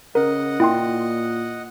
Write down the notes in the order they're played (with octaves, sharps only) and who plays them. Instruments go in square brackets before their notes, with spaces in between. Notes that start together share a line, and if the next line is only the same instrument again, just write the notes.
[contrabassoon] C#3 [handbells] A#4 [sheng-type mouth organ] D#5 F#5
[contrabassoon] A#2 [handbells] E4 G5 C6